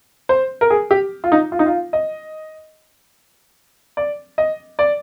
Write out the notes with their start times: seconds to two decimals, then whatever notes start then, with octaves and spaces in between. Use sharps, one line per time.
0.29 C5
0.61 A#4
0.70 G#4
0.91 G4
1.24 F4
1.32 D#4
1.52 F4
1.59 D#4
1.66 F4
1.93 D#5
3.97 D5
4.38 D#5
4.79 D5